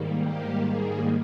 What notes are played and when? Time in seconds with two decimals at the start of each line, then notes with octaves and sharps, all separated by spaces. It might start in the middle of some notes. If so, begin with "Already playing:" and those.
Already playing: G#2 D#3 G3 A#3
0.23 G4
0.65 G#4